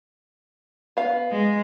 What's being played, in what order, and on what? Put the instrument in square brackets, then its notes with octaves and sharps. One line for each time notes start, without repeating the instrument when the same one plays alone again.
[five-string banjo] B3 F5
[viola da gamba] G#3